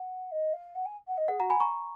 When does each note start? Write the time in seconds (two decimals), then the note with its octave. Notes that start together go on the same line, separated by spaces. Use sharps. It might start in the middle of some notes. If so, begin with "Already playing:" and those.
Already playing: F#5
0.31 D#5
0.53 F5
0.75 F#5
0.85 G#5
1.07 F#5
1.17 D#5
1.28 G#4 F#5
1.39 F#4 F#5 A#5
1.50 G#5 B5
1.60 A#5 C#6